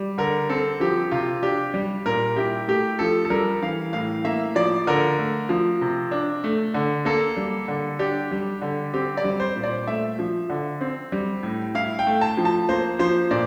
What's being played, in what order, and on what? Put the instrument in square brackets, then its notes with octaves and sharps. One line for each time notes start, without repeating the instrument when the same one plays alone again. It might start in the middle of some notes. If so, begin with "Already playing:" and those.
Already playing: [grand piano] G3
D3 A#4
C4 A4
F3 G4
C3 F4
D4 G4
G3
A#2 A#4
E4 G4
A3 G4
F3 A4
A4
G3 A#4
E3 F5
A2 F5
A#3 E5
F3 D5
D3 A#4
A3
F3
C3
D4
A3
D3
A#3 A4
G3
D3
D4 G4
G3
D3
C4 G4
D5
G3
C5
A#2
D5
A3 E5
F3
D3
C4
G3
A2
E4 F5
G5
A3
A5
F3
A5
A#3 C5
F3 C5
A#2 D5